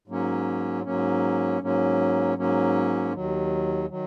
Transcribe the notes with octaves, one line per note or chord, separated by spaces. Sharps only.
G#2 F#3 A#3 C#4
G#2 F#3 A#3 C#4
G#2 F#3 A#3 C#4
G#2 F#3 A#3 C#4
D#2 D#3 F#3
D#3 F#3